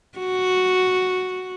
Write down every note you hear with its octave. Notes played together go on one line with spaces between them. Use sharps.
F#4